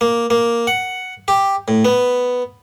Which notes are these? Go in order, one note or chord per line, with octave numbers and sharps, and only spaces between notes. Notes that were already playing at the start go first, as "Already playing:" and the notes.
A#3
A#3
F#5
G4
A2
B3